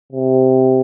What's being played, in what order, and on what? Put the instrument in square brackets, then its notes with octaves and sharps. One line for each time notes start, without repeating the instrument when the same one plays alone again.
[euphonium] C3